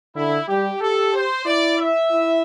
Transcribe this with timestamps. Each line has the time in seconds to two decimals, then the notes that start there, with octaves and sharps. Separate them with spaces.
0.15 D3 E4
0.48 G3 G4
0.80 G4 A4
1.14 C5
1.45 E4 D5
1.79 E5
2.12 E4